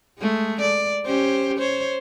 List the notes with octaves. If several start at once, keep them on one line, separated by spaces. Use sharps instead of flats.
G#3 A3
D5
C#4 G4 C5
C5 C#5